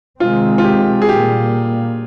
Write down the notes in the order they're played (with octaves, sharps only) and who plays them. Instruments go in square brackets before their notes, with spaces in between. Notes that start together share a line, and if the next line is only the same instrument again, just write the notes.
[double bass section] C3 D#3 G#3 C4 [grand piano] F4
[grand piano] F4
G4
G#4
[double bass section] A#2 G3 A#3 [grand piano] G4